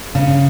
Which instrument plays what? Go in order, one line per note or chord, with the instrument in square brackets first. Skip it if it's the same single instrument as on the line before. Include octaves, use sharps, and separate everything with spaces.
[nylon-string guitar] C#3